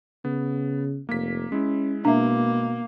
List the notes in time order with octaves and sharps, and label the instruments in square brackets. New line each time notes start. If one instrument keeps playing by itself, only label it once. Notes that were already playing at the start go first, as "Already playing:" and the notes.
[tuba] C#3 [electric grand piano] B3
[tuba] F1 [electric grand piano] A#3 B6
[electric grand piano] G#3 E4 [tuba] C#4
[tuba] B2 [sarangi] A#3 [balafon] D4 E5